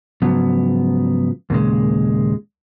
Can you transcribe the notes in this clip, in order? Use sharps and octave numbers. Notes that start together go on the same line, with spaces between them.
G#2 C#3 F3 F#3 B3
D#2 A#2 C#3 G#3